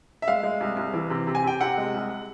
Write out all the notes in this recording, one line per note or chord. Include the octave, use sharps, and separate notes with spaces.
E5
G#3 F5
G#3
C2
C2
E3
C3
C3
G#5
C3 G5
C3 F#5
G#3
C2